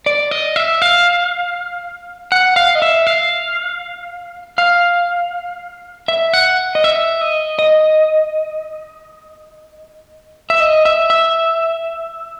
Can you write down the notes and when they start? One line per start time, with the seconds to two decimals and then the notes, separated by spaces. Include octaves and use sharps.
0.06 D5
0.31 D#5
0.56 E5
0.82 F5
2.32 F#5
2.56 F5
2.75 D#5
2.82 E5
3.07 F5
4.58 F5
6.08 E5
6.34 F#5
6.75 D#5
6.84 E5
7.21 D#5
7.59 D#5
10.50 E5
10.60 D#5
10.85 E5
11.10 E5